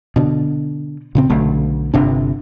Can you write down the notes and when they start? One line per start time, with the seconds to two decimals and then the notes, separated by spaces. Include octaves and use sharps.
0.16 B2 D3
1.15 A#2 C#3 C4
1.30 B1 D3 A3
1.94 G1 C3 D4